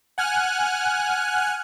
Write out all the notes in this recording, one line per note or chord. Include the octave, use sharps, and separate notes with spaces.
F#5 G#5 F6 F#6